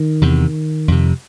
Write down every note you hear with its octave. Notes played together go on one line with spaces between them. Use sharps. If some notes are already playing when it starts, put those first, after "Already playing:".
Already playing: D#3
E2 C3
F2 C3